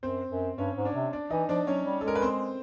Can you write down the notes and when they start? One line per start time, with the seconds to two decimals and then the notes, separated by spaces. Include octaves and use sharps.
0.03 F#2 C4 C5
0.31 F#2
0.58 G2 C#4 C#5
0.76 G#2
0.85 D4 D5
0.94 C3
1.13 D4 D5
1.30 E3 D#4 D#5
1.49 F3 D4 D5
1.67 F#3 C#4 C#5
1.85 G3
2.01 A4
2.03 G#3 A#4
2.15 B4
2.22 C4 C5